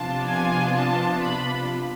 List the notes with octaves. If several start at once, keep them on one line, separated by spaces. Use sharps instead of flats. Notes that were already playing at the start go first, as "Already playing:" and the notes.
Already playing: C3 F3 B3 D4 F4 A5
G#5
A5
B5